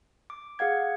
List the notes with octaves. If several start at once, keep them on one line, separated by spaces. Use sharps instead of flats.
D6
G#4 F5 F#5 G#6